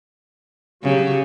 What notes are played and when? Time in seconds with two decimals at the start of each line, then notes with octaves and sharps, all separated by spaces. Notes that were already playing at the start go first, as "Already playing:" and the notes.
0.83 C#3 F#3 G4